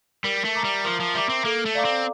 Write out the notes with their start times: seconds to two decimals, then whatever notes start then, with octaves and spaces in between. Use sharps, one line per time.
0.24 G3 A#4
0.45 A3
0.55 E5 A#5 D6
0.64 G3
0.84 F3 A#4
1.00 F3
1.15 G3 E5 A#5 D6
1.29 C4
1.45 A#3 A4
1.66 A3
1.75 D5 F5 A#5 D6
1.85 C4